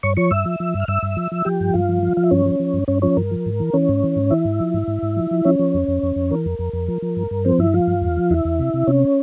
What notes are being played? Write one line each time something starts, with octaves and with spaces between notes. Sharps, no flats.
G2 C#5 C#6
F3 C#5 C#6
G2 E5 E6
F3
F3
G2
F6
G2 E5 E6
G2
F3
F3
F3 G4 G5
G2
G2 F4 F5
F3
F3
F3 F5
E5
G2 C#4 C#5
F3
F3
G2
G2 C#4 C#5
F3 C#4 C#5
G2 A#4
F3
G#2
E3
E3 C#4 C#5
G#2
E3
G#2
E3 E4 E5
G#2
F3
G#2
G#2
G#2
F3
F3
F3 C#4 C#5
F3
F2
F2
F2
F2
E3 A#4
F2
F2
F2
F3
F3
G2
G2
F3 C4 C5
G2 E4 E5
F3 F4 F5
G2
E2
F3
E2 E4 E5
E2
C3
C3
C3 C#4 C#5